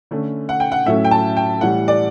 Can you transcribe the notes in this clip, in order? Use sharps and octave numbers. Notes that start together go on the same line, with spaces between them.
D3 A3 C#4
F#5
G5
F#5
A2 F#3 A3 C#4 E5
G5
A5
G5
A2 E3 G3 F#5
D5